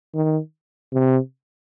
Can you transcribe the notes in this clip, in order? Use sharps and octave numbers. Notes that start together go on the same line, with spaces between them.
D#3
C3